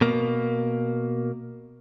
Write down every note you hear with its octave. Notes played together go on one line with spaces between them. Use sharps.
B2 A#3